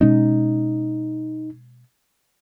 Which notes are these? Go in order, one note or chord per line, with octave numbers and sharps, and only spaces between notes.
B2 G#3 C#4 D#4